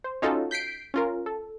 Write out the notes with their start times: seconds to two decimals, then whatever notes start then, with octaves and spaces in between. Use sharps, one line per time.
0.04 C5
0.22 C#4 D#4 F4 F#4 A4
0.51 G6 B6 C7 D7
0.94 C#4 F4 A#4
1.26 A4